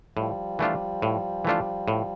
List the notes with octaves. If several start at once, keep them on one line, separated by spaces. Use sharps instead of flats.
A2 F3 G3
E3 A3 D4 F4
A2
E3 A3 D4 F4
A2